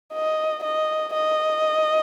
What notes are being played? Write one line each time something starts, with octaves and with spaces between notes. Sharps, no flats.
D#5
D#5
D#5